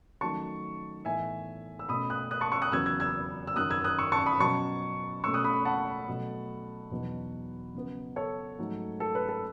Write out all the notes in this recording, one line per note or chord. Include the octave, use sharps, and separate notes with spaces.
D#3 F#3 A3 C#4 A5 C#6
A2 E3 B3 D#4 E5 G#5
E6
B2 A3 C#4 B5 D#6
D#6 F#6
D#6 F#6
A5 C#6
C#6 E6
D#6 F#6
E2 C#3 F#3 B3 E6 G#6
E6 G#6
E6 G#6
E6
F#2 D#3 F#3 C#4 D#6 F#6
E6 G#6
D#6 F#6
C#6 E6
A5 C#6
B5 D#6
B2 F#3 C#4 A5 C#6
B2 A3 C#4 C#6 E6
D#6 F#6
B5 D#6
F#5 A5
B2 F#3 A3
E2 B2 F#3 B3 D#4
C#3 F#3 B3
A4 C#5
G#2 F#3 A3
A4
B4
A4